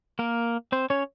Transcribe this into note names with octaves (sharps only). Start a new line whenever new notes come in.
A#3 A#4
C4 C5
C#4 C#5